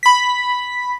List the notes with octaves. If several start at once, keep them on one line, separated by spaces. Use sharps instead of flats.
B5 B6